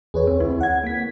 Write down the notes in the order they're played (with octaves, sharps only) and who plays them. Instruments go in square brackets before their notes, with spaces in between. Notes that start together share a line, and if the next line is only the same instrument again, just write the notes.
[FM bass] E2 [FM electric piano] G#4 B4 C#5
[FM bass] C4
[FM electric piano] D2 [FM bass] E4
[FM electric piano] F#5 G#6
A#3 B6